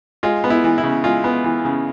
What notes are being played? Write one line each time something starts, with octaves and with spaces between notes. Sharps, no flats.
G#3 F4
B3
E4
E3
E4
C#3
G#3 F4
B3
E3
C#3